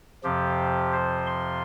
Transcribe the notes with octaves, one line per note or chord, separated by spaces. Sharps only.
F2 C3 F3 G4
C5
C6